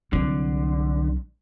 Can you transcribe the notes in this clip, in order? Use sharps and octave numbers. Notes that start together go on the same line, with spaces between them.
C2 D3 F#3